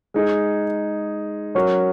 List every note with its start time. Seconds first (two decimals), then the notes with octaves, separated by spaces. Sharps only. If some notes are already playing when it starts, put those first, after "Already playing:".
0.14 G#3 D#4 G#4
1.55 F#3 C#4 F#4 A#4 C#5